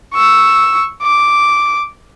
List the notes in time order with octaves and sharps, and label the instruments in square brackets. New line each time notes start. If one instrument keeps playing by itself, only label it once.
[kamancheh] C#6 E6
D6